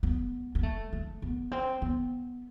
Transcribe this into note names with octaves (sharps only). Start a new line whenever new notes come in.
B3
B3
A3
A3
B3
C4
B3